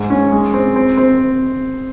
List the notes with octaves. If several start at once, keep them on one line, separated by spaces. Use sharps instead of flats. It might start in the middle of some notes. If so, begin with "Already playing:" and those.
Already playing: G#2
C#4
G#3
C4
C4
C4